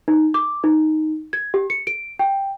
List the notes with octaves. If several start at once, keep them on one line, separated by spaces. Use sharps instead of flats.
D#4
D6
D#4
G#6
G4
C#7
D7
G5